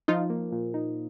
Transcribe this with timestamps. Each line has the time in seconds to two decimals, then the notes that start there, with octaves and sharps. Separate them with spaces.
0.08 F3 D#4 F4
0.30 A#3
0.52 A#2
0.74 D#4